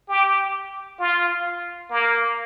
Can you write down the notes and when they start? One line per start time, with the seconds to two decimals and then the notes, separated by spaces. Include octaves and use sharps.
0.09 G4
0.99 F4
1.91 A#3